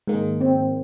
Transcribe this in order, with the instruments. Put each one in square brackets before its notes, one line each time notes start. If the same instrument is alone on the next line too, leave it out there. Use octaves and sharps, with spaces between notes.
[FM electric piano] G#2 D#3 A#3 [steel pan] G#3
[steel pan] C4